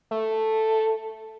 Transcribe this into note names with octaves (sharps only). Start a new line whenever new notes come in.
A3